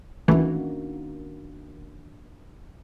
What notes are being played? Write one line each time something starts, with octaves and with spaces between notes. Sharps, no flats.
D#3 E3 A3 A#3 C#4 D4 F#4